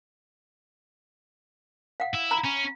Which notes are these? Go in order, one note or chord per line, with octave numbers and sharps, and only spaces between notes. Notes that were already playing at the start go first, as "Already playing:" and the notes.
F5 F#5
E4
A#5 B5
C#4